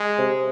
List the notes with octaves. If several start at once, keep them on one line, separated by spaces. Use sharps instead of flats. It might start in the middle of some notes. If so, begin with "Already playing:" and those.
Already playing: G#3
C3